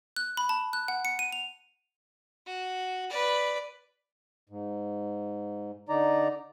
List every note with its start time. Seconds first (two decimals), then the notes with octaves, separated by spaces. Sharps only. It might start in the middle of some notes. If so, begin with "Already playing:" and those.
0.16 F#6
0.37 B5
0.49 A5
0.73 F#6
0.88 F#5
1.05 C#7
1.19 D#7
1.32 F7
2.46 F#4
3.10 B4 D5
4.50 G#2
5.89 D3 D#4 D5 A#5